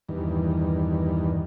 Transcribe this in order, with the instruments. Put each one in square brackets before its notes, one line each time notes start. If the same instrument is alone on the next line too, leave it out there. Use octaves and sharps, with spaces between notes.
[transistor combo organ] E2 G2 D#3